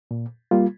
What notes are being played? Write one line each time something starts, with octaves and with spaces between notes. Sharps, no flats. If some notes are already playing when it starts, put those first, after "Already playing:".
A#2
G3 A#3 F4